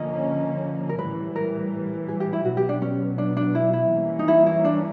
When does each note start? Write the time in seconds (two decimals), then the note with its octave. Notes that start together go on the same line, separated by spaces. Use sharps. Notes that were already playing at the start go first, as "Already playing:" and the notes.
Already playing: D3 F3 A#3 C#4 D#5
0.89 A#4
0.98 A2 E3 G3 B4
1.36 A#4
2.08 G#4
2.20 G4
2.33 E4
2.45 B2 F#3 B3 F#4
2.57 G4
2.69 D4
2.82 C#4
3.18 D4
3.37 D4
3.55 E4
3.73 E4
3.92 E3 G3 A#3 C#4
4.19 D#4
4.28 E4
4.46 E4
4.65 D4